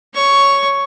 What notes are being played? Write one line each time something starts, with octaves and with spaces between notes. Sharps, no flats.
C#5 C#6